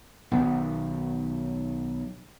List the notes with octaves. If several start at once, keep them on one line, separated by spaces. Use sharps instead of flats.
B1 D#3 B3